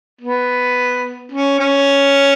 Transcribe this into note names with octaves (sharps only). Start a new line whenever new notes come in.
B3
C#4
C#4